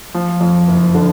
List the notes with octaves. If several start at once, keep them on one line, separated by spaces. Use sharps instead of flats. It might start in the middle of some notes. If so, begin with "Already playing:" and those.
F3
F2
F#1
D3